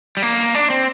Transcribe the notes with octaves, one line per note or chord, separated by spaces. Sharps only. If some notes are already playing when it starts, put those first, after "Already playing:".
G3
A#3
D4
C4